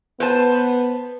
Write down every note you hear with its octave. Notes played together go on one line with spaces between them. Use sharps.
B3 B4 C5 A5